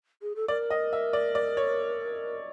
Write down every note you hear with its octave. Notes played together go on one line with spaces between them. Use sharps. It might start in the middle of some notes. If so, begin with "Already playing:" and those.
G#4
A4
A#4 D5
D#5
E5
D5
D5
C#5